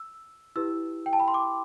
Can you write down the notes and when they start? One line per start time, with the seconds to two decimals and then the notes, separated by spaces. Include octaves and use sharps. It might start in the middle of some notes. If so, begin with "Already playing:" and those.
Already playing: E6
0.56 E4 G4 B4 E6
1.06 G5
1.13 A5
1.20 B5
1.28 C6
1.34 D6